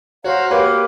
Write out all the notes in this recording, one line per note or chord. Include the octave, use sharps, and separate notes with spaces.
F#4 C5 C#5 F5 A#5
A#3 G4 B4 C#5